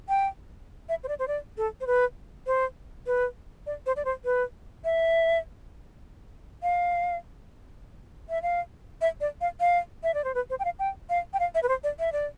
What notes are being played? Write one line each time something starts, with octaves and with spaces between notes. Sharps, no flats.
G5
E5
C5
D5
C5
D5
A4
C5
B4
C5
B4
D5
C5
D5
C5
B4
E5
F5
E5
F5
E5
D5
F5
F5
E5
D5
C5
B4
C5
G5
F5
G5
F5
G5
F5
E5
B4
C5
D5
E5
D5